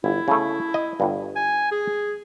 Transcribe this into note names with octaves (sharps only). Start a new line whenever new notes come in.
G1 E4
C#3 A3
D#5
G1 G2
G#5
G#4